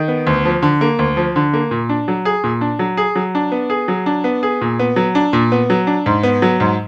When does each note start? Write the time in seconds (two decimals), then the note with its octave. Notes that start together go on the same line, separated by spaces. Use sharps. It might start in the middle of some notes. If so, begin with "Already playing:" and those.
Already playing: D#3
0.08 B3
0.27 D2
0.45 F3
0.62 D3
0.81 A#3
0.99 D2
1.17 F3
1.36 D3
1.54 A#3
1.71 A#2
1.89 D4
2.08 F#3
2.25 G#4
2.44 A#2
2.61 D4
2.79 F#3
2.97 G#4
3.16 F#3
3.35 D4
3.52 B3
3.70 G#4
3.88 F#3
4.06 D4
4.24 B3
4.43 G#4
4.61 A#2
4.79 B3
4.96 F#3
5.15 D4
5.33 A#2
5.52 B3
5.70 F#3
5.87 D4
6.06 G#2
6.23 B3
6.42 F#3
6.60 G#2